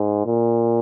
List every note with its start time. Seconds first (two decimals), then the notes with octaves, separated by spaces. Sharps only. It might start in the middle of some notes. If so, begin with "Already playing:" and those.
Already playing: G#2
0.26 A#2